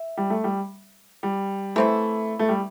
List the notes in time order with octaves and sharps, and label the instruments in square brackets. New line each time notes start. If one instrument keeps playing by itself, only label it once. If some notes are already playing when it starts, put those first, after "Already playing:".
Already playing: [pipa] E5
[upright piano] G3
A3
G3
G3
[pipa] E3 C4 E4 [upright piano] A3
[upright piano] A3
G3